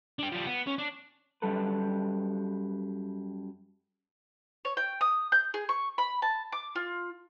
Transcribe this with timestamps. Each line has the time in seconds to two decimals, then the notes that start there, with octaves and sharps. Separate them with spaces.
0.19 D4 G5
0.32 F3 G3
0.46 B3
0.67 C#4
0.78 D4
1.42 F#2 G3 G4 A4 B4
4.65 C#5
4.77 G5
5.01 D#6
5.32 G6
5.54 G#4
5.69 C#6
5.98 B5
6.22 A5
6.52 D6
6.75 F4